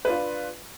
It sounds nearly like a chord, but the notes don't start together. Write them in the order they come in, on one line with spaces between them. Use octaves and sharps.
B4 D4 F4